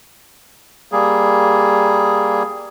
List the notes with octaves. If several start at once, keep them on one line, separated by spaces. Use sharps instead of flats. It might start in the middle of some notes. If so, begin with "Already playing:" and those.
G3 A#3 G#4